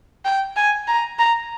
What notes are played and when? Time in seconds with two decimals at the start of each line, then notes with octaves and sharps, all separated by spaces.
0.25 G5
0.56 G#5
0.88 A#5
1.19 A#5